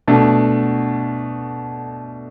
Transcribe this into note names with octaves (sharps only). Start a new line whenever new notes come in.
B2 A3 D4